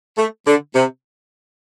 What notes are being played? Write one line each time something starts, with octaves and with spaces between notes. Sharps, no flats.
A3
D3
C3